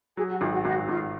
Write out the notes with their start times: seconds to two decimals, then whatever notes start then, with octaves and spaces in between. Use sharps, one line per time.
0.17 F#3 G#4
0.30 F#4
0.40 G#1 F4
0.52 F#4
0.65 G#1 F#4
0.89 G#1 F4